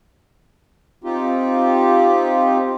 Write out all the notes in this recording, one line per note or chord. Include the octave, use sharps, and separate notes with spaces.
C4 D#4 F4 G4